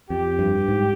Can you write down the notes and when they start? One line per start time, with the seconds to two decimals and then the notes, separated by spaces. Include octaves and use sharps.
0.10 F2 G4
0.39 G2
0.68 G#2